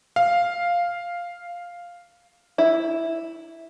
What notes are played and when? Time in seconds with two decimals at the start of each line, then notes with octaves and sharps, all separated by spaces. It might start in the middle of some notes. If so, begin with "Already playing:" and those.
0.16 F5
2.58 E4